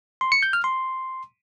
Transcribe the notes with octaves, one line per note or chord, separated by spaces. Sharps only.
C6
C#7
G6
F6
C6